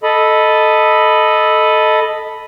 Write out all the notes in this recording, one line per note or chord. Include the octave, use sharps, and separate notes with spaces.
A4 D#5 B5